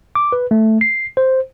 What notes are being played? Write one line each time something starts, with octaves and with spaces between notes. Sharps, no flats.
D6
B4
A3
C7
C5